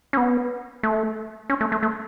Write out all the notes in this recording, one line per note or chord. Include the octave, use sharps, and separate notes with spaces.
C#4
B3
A3
C#4
A3
A3
A3